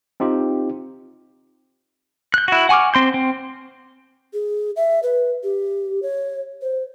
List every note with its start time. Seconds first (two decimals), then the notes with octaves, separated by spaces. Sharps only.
0.20 C4 D#4 F4 G4
2.34 F#6 G6
2.48 E4 F#4
2.69 F#5 G#5 C#6 D6 F6
2.94 C4 C6 G6
3.14 C4
4.34 G#4
4.76 E5
5.03 B4
5.43 G4
6.02 C#5
6.62 C5